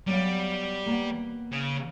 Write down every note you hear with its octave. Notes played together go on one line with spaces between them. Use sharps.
F#3 G3 B3 F5
A#3 B3
C#3